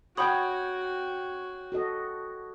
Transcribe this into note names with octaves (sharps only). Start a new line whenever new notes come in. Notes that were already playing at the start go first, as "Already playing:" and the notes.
F#4 C#5 F#5 G5 B5 D#6
F#4 A4 D#5